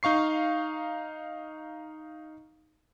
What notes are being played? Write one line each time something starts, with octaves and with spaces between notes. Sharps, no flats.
D#4 F5 C#6 C7